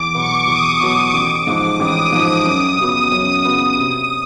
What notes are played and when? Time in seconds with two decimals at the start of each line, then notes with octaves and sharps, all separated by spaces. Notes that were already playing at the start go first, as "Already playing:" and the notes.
Already playing: E2 D6
0.15 B2 F#3 B3 C#6
0.48 E2 D#6
0.81 B2 F#3 B3 D6
1.14 A1
1.47 G#2 F3
1.80 A1 D#6
2.12 G#2 F3
2.46 F#2
2.79 C#3 F#3 B3
3.12 F#2
3.45 C#3 F#3 B3
3.78 C3 D#6